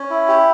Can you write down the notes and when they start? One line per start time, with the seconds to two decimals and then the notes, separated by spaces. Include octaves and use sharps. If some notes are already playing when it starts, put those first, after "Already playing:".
Already playing: C#4
0.10 E4
0.28 G4